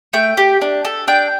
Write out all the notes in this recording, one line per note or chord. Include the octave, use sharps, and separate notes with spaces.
A3 G5
G4
D4
A4
D4 G5